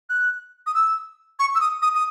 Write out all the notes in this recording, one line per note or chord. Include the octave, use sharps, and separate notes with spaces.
F#6
D#6
E6
C#6
E6
D#6
D#6
D#6